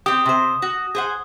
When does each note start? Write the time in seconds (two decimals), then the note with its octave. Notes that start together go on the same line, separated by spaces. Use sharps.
0.06 C4 G4 D#6
0.26 C3 C5
0.62 F#4
0.95 G#4 C5 F#5